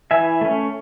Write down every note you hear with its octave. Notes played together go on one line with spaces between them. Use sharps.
E3 E5 G#5
A3 C#4